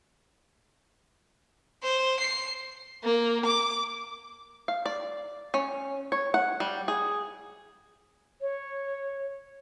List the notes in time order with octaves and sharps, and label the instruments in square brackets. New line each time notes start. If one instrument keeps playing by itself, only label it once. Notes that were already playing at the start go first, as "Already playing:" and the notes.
[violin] C5
C7
A#3
D6
[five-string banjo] F5
D5
C#4
C#5
F#5
G3
G#4
[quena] C#5